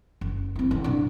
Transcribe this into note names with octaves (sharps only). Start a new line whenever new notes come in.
F#1
C4 E4
F#1 E3
A#2 D3